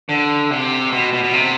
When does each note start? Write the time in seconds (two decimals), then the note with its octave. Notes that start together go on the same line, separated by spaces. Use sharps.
0.09 D3
0.50 C3
0.92 B2
1.13 B2
1.24 B2
1.34 C3